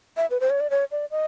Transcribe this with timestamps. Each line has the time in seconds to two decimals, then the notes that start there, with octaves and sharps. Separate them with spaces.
0.17 E5
0.30 B4
0.40 C5
0.50 C#5
0.60 D5
0.70 C#5
0.91 D5
1.11 D#5